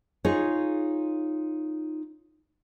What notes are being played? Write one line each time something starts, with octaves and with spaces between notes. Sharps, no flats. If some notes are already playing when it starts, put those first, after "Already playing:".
D#4 F4 G#4 C#5